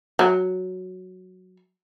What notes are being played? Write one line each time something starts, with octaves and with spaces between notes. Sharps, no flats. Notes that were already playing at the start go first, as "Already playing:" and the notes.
F#3